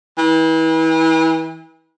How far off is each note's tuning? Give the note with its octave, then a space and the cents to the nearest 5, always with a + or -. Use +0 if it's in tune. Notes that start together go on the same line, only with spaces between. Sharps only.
E3 -35